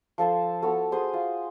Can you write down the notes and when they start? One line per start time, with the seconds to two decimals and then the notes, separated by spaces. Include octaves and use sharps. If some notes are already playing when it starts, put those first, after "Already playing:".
0.18 F3 A4 A5 C6
0.62 B3 F#4 A4
0.92 F#4 G#4 C5 G#5
1.13 F4